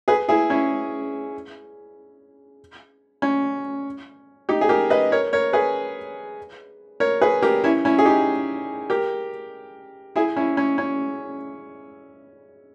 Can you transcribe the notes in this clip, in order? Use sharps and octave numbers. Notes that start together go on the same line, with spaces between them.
G#4 B4
E4 G#4
C#4 E4
C#4
D#4 G4
G#4
G4 A#4
B4 D#5
A#4 C#5
A#4 C#5
G#4 B4
A#4 C#5
G#4 B4
G4 A#4
C#4 E4
C#4 E4
G#4
D#4 G4
G4 A#4
E4 G#4
C#4 E4
C#4
C#4